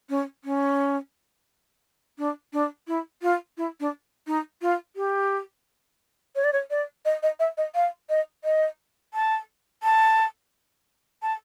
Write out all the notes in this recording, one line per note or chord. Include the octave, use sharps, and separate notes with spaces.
C#4
C#4
D4
D4
E4
F4
E4
D4
D#4
F4
G4
C#5
D5
C#5
D5
D#5
D#5
E5
D#5
F5
D#5
D#5
A5
A5
A5